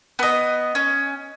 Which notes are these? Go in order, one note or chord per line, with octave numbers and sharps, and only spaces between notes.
B3 D#5
C#4